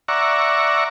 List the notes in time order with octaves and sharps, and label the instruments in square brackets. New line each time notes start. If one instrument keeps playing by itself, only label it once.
[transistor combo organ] D5 E5 F#5 A#5 C#6